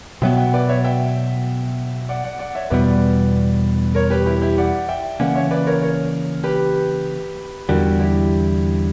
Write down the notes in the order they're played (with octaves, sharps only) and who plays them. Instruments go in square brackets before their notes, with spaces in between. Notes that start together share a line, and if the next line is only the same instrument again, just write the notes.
[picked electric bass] B2 F#3 B3 [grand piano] E5 G5
[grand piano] E5 G5
B4 D5
C#5 E5
E5 G5
D5 F#5
D5 F#5
D5 F#5
C#5 E5
[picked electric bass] E2 B2 G3 B3 [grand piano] B4 D5
[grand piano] A#4 C#5
G4 B4
E4 G4
E4 G4
D5 F#5
E5 G5
[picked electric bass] C#3 E3 A#3 C#4 [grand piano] D5 F#5
[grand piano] C#5 E5
B4 D5
A#4 C#5
A#4 C#5
G4 B4
[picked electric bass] E2 D3 G3 [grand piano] F#4 A#4
[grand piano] E4 G4